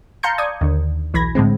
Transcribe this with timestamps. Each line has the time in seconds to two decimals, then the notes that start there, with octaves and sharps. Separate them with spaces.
0.23 F5 A5 A#5 C6 G6 C#7
0.38 D5 D#6 G#6
0.61 D#2 D3
1.14 B1 E3 B5 G#6 A#6
1.35 A2 D3 G#3 C4